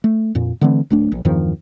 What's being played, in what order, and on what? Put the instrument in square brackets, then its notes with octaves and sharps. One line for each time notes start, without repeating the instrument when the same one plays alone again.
[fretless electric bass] A3
F2 A#2
D3 E3 A3 C4
D1 A3 D4
A#1
E2 G2 D#3 F3